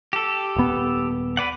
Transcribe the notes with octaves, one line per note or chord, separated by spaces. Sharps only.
G4 A4
D#1 B3
B4 D5 F#5